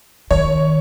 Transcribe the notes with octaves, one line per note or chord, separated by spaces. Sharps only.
D#3 C#5